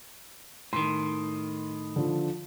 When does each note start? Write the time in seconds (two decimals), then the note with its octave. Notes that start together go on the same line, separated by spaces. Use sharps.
0.73 A2 D#3 C6
1.96 D3 F3